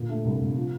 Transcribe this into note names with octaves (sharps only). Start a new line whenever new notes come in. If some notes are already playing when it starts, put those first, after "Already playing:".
Already playing: A#2 D3
A3
C2
C2
F3